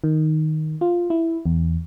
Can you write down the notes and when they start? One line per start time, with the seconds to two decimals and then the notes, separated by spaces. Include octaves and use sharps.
0.04 D#3
0.81 F4
1.10 E4
1.46 E2